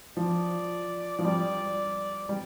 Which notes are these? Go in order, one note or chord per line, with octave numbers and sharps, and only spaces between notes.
F3 D5
F3
G3 D5
G3